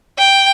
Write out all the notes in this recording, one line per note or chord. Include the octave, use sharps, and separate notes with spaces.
G5